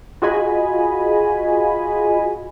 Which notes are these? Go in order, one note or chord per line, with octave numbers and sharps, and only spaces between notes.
F4 F#4 G#4 D#5 G#5 B5